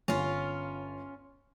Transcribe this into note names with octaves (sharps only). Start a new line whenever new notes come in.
G1 C#4 F4